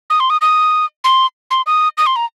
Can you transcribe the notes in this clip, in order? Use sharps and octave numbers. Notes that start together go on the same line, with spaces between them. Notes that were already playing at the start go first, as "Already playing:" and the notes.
D#6
C6
D#6
D#6
C6
C6
D#6
D#6
C6
A#5